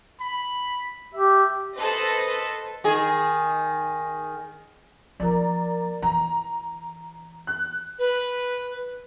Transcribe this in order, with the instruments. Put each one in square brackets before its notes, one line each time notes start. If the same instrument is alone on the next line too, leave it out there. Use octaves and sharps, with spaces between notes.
[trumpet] B5
[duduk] G4 [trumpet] E5
[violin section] A4 B4 C5 D#5
[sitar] D#3 G#4
[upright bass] F3 A#3 [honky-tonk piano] A#4 D5
[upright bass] E3 [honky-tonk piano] A#5
[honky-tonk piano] F#6
[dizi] B4